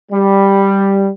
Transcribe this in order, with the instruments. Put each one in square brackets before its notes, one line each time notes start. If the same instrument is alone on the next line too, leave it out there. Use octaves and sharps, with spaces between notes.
[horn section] G3